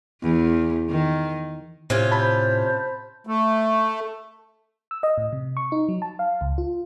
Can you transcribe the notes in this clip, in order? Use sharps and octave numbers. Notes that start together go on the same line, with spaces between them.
E2
D#3
A2 C3 C#4 F4
C5 A5 B5
A3
E6
D#5
A2
C3
C#6
D#4
F#3
A5
F5
C#2
F4